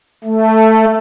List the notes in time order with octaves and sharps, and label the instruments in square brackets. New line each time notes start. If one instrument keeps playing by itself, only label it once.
[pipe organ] A3